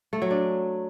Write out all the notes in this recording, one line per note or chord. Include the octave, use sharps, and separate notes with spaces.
A3
F#3
D4